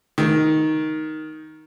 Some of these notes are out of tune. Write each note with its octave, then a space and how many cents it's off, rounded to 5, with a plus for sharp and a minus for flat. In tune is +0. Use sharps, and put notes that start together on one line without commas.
D#3 +5